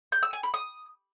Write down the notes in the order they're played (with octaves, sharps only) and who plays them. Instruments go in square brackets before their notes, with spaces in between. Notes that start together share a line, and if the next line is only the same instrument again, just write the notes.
[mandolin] G6
E6
G#5
B5
D#6